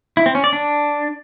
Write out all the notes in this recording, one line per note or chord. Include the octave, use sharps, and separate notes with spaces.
E4
C4
C#4
D5
D4